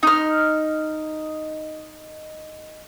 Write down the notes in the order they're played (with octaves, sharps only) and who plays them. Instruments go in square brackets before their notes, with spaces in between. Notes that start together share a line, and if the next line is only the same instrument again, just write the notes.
[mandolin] D#4 F6